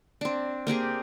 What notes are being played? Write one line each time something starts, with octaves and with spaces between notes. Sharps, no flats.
C4 D4
A#3 C4 G4 G#4